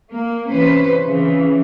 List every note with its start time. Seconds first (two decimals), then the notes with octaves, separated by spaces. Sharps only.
0.11 A#3
0.48 C3 E3 C#4 B4 C5
1.05 C#3 E3